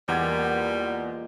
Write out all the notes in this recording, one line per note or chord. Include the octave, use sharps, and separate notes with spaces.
E2 A#2 G3 G#3 D5 F#5 G#6